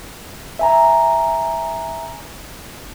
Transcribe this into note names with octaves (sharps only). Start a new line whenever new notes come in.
E5 G#5 A#5